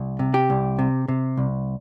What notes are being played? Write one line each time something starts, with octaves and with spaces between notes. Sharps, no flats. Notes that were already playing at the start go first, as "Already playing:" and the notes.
Already playing: C2
C3
G4
C2
C3
C3
C2